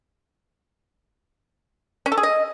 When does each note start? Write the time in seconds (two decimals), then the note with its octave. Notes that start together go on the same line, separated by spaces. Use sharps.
2.06 C#4
2.12 A4
2.18 G#4
2.23 D#5